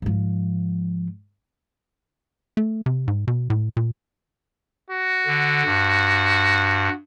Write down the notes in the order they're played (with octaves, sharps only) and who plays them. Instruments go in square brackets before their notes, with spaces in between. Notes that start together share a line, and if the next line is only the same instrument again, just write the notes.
[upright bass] G#2 F3
[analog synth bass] A3
C3
G#2
B2
A2
A#2
[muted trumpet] F#4
[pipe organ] D3
G2